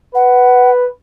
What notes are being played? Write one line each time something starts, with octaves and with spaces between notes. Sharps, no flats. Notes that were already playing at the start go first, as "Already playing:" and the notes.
B4 F#5